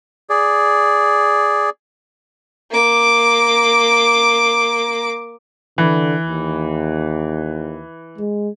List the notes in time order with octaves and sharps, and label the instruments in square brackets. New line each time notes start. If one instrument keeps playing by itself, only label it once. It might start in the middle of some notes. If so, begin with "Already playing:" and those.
[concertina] G#4 D5
[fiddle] A#3 D6
[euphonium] D3 [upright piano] E3
[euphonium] D#2
G#3